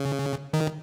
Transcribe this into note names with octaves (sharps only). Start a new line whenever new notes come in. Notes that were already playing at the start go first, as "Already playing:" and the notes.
Already playing: C#3
D#3